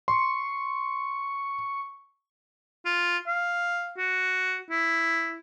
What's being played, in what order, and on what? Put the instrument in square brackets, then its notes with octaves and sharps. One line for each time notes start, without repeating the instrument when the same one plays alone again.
[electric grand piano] C6 [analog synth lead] C#6
[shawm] F4
F5
F#4
E4